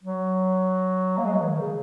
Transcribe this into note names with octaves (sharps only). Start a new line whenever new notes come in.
F#3
A#3
G#3
F#3
E3
D#3
C#3